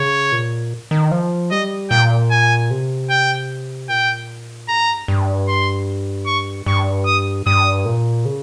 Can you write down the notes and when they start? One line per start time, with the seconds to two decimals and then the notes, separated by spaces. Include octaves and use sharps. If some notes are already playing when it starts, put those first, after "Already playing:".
Already playing: C#3 C#5
0.32 A#2
0.91 D#3
1.11 F3
1.51 G3 D#5
1.90 A#2 G5
2.31 G#5
2.70 C3
3.10 G5
3.89 A#2 G5
4.68 G#2 A#5
4.88 G2
5.08 G2
5.48 C6
6.27 C#6
6.66 G2 C#6
7.06 D#6
7.46 G2 D#6
7.85 A#2
8.25 C#3